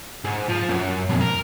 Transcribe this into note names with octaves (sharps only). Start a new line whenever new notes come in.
G#2
F3
F#2
B1 F2
A#4